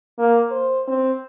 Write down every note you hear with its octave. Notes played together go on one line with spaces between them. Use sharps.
A#3
C5
C4